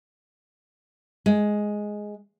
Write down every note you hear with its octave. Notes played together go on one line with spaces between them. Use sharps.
G#3